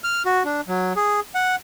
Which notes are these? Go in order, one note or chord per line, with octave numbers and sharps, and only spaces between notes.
F6
F#4
D4
F#3
G#4
F#5